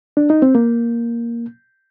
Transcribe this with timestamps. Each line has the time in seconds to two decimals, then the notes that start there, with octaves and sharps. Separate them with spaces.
0.17 D4
0.30 D#4
0.42 C4
0.55 A#3